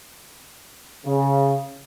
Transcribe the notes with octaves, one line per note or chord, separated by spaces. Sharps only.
C#3